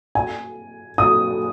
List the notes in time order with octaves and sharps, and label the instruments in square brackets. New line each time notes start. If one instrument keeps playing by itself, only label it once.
[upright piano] G#5
D#6